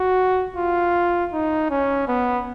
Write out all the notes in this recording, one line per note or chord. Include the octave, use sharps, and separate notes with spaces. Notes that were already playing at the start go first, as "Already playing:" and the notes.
Already playing: F#4
F4
D#4
C#4
B3